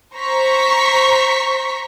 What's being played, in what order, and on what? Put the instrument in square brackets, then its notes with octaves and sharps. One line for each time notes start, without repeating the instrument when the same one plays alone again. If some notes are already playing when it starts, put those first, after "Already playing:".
[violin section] C5 A#5 C#6 B6